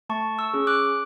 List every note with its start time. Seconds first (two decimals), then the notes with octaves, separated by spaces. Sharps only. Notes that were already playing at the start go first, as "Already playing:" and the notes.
0.09 A3 A5 C#6
0.39 C#6 E6
0.54 C#4 G#4
0.67 D6 F#6